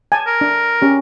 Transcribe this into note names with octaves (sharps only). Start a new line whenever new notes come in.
G#5 A5
A#4
D4
C#4 G4